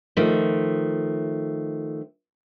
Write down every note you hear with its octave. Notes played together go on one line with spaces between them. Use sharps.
D#3 F3 A3